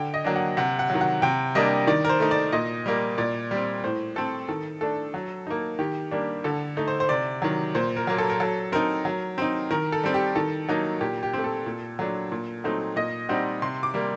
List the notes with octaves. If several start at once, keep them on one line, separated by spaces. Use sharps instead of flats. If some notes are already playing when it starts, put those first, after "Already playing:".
Already playing: D3 G5
D#5
F#3 A#3 D4
F#5
C3 F#5
F#5
D#3 F#3
F#5
C3 G5
G3 A#3 D4 D#5
D#3 D5
A#4
C5
A3 D#4
D5
A#2 D#5
G3 A#3
A#2 D5
G3 C4
A2 C5
A3 C4 A4
D#3 A4
A3 D4 A4
F#3
A#3 D#4
D#3 G4
G3 A#3 D4
D3 A4
A3 D#4
C5
C5
C3 D5
D#3 F#3
A#2 C5
A#4
F#3 A#3
A4
A#4
F#3 A4
C4 D#4 A#4
F#3
C4 D#4
D#3 A#4
A4
G3 C4
G4
D#3 A4
F#3 A#3 D#4
A#2 G4
G4
A3 C4
A4
A#2
F#3 A3 D4
A#2
F#3 A3 C4 D#4
A#2 D#5
G3 C4 D#4 F#5
C3 C6
D6
G3 A#3